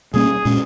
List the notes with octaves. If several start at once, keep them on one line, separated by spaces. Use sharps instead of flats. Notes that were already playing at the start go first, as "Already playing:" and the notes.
B2 G3 A#3 C#4 G#4
A#2 G#3 C#4